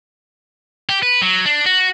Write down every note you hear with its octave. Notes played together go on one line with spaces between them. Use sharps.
G4
B4
F#3
D4
F#4